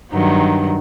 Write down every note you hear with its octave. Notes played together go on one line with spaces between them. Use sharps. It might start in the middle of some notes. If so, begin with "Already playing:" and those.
G2 D#3 F#3